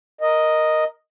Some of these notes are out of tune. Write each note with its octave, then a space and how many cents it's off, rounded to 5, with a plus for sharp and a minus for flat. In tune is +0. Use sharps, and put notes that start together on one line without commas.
A#4 +0 D#5 +0